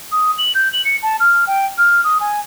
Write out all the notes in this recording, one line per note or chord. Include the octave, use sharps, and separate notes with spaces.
D#6
F#7
G6
F#7
C#7
A5
F6
G5
F6
D#6
G#5